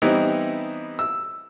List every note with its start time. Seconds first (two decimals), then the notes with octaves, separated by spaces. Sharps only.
0.02 E3 G3 B3 C4 D#4 E4
0.99 E6